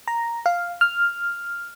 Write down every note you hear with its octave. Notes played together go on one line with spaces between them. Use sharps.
A#5
F5
F6